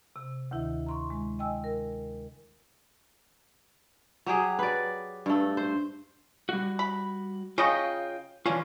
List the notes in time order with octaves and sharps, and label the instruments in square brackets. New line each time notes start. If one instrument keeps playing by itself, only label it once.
[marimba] C3
D2 D#3 E4 E5
A#5 C6 C#6
G#3
D#5 G5 G#5 E6
A#4
[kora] F#3 G4 G#4
B4 D5
G2 A3
C5
[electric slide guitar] G3 F#4
[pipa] B5
[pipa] C#3 D#5 C#6 [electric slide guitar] F4 G5
[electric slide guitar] E3 F4 [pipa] C#4 D4